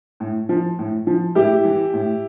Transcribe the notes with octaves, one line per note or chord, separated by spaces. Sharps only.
A2
F3
A2
F3
A2 E4 G4
E3
A2